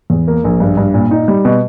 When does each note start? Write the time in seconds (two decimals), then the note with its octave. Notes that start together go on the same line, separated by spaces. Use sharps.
0.10 E2
0.28 A#3
0.44 A#1
0.60 G2
0.77 G2
0.94 A#2
1.11 D#4
1.28 G3
1.45 B2